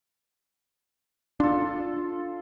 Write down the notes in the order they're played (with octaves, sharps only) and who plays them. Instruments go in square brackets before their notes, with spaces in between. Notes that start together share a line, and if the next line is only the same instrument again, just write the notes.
[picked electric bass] D4 [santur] F4 A4